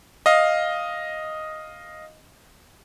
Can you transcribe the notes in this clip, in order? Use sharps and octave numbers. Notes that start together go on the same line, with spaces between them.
D#5 F5